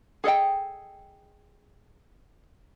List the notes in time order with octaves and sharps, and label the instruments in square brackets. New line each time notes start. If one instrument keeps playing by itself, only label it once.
[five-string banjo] G#4 A4 D#5 G5